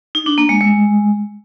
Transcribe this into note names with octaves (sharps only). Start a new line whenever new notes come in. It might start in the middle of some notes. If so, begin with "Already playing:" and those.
D#4
D4
A#3
G#3
G#3